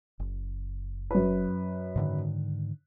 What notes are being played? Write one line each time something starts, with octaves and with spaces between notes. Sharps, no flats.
F#1
F#2 B4
G#2 D3 D#3